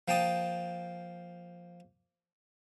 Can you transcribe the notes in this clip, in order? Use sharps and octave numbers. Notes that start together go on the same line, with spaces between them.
F3 A#3 G5 A5 D#6